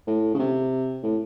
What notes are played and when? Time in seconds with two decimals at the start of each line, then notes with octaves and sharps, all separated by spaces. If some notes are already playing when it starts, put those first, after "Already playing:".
0.07 A2
0.34 C#3
0.39 C3
1.03 A2